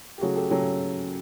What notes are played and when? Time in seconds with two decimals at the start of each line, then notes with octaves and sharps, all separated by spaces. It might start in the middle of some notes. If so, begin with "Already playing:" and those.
0.18 G4
0.21 C#3 F#3 A3 F#4 G#4
0.36 G4 A4
0.50 C#3 F#3 A3 G4 A4